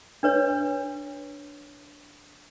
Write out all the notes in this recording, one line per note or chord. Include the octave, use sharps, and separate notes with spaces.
D4 B4 C#5